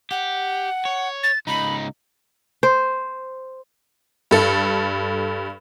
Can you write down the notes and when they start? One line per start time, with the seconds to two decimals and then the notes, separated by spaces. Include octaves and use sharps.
0.11 G4 F#5
0.85 C#5
1.23 A6
1.47 C#2 D#4 B5
2.63 C5
4.31 G2 A4